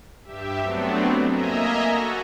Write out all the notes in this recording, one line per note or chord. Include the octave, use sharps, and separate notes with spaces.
G2 G4 E5
F#3 A3 B3 C4 D4
A#3 D#5 E5 G#5 A#5
F#4 A4